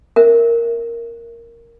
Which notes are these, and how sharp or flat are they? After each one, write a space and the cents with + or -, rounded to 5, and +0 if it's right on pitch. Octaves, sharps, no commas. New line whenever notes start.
C#4 -30 A#4 +0 E5 +0